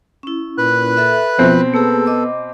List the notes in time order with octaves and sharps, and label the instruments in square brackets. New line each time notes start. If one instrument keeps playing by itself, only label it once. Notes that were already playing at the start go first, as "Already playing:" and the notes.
[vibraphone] C#4 E4
[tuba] A#2 [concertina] B4 F#6
[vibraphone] A4 E5
[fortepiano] B2 C4 [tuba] F3
[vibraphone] A#3 G#4 [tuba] B3 [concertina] A4
[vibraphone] D#5 D6